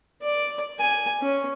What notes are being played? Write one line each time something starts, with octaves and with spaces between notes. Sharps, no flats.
D5
G#5
C#4